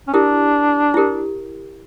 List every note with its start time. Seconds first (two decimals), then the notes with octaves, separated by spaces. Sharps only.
0.08 C#4
0.13 D4 E4 G4 A#4
0.94 E4 G4 A#4